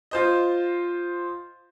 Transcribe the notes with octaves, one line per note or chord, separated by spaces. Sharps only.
F4 C5 D#5